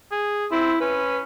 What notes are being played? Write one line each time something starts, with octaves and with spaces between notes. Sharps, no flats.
G#4
C4 E4
C#4 B4